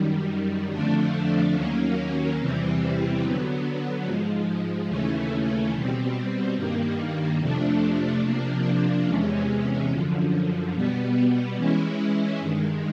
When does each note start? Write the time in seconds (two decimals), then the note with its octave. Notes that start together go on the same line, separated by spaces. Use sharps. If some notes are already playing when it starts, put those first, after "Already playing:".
Already playing: F#2 D#3 G3
0.72 F2 D3 F3 A3 D4
1.55 D#2 D#3 F#3 A#3 C#4
2.39 E2 C3 E3 G3 C4
3.22 D3 F#3 B3
4.05 G#2 F3 G#3
4.89 D#2 C#3 E3 A3 C#4
5.73 B2 G3 C4
6.56 G2 D#3 G3 A#3
7.39 F2 C3 F3 A3 D4
8.22 C3 F3 A#3 D4
9.06 E2 C3 E3 G#3 C#4
9.90 F#2 D3 F3
10.73 B2 G3 B3
11.57 E3 G#3 C#4 E4
12.40 G2 D#3 G#3